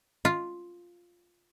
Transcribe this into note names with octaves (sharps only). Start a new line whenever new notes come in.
F4